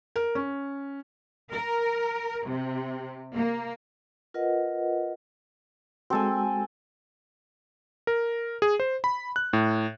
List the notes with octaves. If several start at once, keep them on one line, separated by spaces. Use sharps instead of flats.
A#4
C#4
A#4
C3
A#3
F4 A#4 B4 D#5 F#5
G#3 C4 F#4 A4 G#5
A#4
G#4
C5
B5
F#6
A2